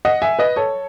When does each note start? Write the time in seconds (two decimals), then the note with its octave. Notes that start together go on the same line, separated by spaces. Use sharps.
0.05 D#5 F#5
0.22 E5 G#5
0.39 B4 D#5
0.56 A4 C#5